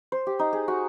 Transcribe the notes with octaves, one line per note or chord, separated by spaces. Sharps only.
C5
G4
D#4
G#4
F#4